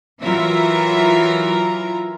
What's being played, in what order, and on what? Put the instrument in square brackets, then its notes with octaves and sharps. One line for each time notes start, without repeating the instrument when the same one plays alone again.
[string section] E3 F#3 F4 A#4 E5